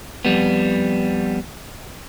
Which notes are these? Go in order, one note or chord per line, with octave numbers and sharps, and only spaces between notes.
F2 G#2 G3 B3